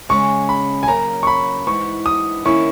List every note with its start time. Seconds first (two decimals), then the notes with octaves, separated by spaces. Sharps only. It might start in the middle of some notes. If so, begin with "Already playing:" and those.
0.09 C#3 G#3 C#4 C#6
0.49 B5
0.83 G#5
0.88 C#3 F#3 A#3 A#5
1.23 C#6
1.27 B5
1.67 G#2 E3 B3 E4 C#6
2.06 D#6
2.45 D#3 A#3 C#4 E4 C#6